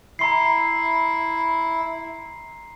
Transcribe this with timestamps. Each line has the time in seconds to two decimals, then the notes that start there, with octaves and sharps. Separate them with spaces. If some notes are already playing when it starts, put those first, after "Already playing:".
0.19 E4 A#5 C6 C7